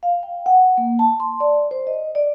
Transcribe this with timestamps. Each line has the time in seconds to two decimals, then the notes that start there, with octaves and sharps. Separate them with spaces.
0.03 F5
0.23 G5
0.46 F#5
0.78 A#3
0.99 A5
1.20 C6
1.40 D5
1.71 C5
1.87 D#5
2.15 D5